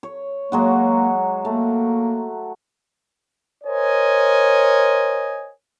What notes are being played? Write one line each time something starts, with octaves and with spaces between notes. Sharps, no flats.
C#5
F#3 G#3 A#3 F#4
A3 A#3
A#4 C5 C#5 D#5 G#5